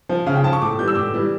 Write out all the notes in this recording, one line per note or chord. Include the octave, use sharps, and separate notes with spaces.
F3
C#3 F5
G5
F3 A5
C#6
A2 D6
E3 G3 G6
E6
A2 D6
E3 G3